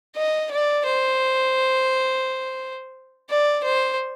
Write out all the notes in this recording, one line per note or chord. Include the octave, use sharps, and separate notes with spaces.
D#5
D5
C5
D5
C5